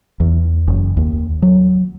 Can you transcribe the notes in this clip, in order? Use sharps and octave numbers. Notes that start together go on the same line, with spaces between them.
E2
F#1
D#2
F#3